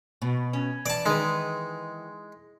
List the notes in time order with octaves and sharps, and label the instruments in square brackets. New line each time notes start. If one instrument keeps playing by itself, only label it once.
[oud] B2
[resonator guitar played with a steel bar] C#4
[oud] E3 [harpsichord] D5 A5
[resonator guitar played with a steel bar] D#3 B4 [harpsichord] G#3